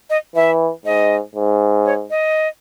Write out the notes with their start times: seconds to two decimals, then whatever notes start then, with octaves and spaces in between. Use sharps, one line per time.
0.10 D#5
0.35 E3 E5
0.85 G#2 D#5
1.35 G#2
1.85 C#5
2.10 D#5